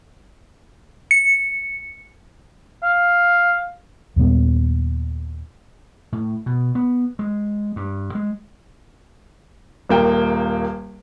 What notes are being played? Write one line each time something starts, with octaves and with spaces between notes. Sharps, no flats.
C#7
F5
D#2 A#2 G3 B3
A2
B2
B3
G#3
G2
G#3
D#1 A#3 G5